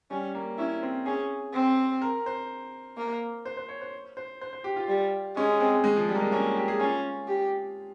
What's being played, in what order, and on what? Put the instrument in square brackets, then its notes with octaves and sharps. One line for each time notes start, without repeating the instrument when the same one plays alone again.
[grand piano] G3 [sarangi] C#4
[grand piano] A#3
[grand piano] C#4 [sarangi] E4
[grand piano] C4
[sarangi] C#4 [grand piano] G#4
[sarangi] C4
[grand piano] A#4
C5
[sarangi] A#3
[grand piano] C5
C5
C#5
C5
C5
C5
C5
G4
F4
[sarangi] G3
[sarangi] G#3 [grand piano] C#4
[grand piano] C4
G#3
F3
G3
A#3
G#3
[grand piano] A#3 [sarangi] C#4
[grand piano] G4
G#4
[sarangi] C#4 [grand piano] F4
[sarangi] G4